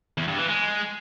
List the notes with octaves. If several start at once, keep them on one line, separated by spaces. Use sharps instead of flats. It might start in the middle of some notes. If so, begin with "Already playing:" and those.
E2
G2
E3
G#3